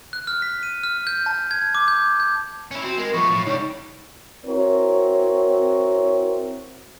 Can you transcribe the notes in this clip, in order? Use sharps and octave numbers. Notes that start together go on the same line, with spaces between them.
F#6
F6
B6
D#7
F6
G6
A5
G#6
D6
G6
G6
C#4 E4
C4 F#4
G#3 A#4
F3 A3 B3 C#6
A2
C#2 G3 D#4 C#5
C4 E4 F#4 A#4 C#5